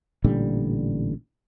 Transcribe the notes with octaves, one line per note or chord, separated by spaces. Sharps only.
A1 A#2 D3 G3